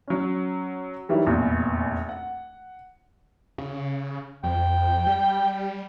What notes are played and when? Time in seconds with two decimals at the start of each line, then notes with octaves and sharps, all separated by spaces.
0.08 F#3 C#4
1.09 D#3 E3 F#3 G3
1.26 F1 A#1 E2
2.09 F#5
3.58 C#3
4.44 F2 G5
5.07 G3